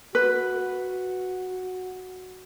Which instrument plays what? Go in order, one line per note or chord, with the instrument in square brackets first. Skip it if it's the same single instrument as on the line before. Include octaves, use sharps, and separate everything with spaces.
[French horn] F#4 [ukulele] B4